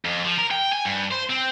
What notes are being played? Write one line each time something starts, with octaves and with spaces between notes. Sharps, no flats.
F2
F3
A#4
G5
G#5
G2
C5
C4